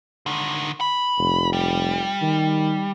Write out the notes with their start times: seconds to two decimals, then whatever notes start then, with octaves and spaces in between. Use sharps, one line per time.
0.26 D3 D#3
0.81 B5
1.18 F1
1.53 G3
2.22 D#3